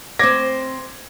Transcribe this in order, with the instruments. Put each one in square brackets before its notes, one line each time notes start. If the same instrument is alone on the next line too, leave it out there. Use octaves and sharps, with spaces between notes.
[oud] C4 C#5 [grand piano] D6 G#6 A#6